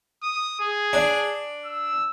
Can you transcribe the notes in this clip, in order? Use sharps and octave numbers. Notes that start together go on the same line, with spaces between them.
D#6
G#4
D4
E6